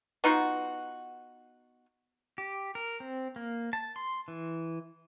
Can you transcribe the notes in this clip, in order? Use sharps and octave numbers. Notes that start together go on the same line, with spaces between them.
B3 D#4 F4 F#4
G4
A#4
C4
A#3
A5
C6
E3